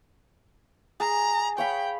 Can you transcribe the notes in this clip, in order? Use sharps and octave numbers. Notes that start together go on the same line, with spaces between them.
G#4 A#5
C#5 F5 G5 B5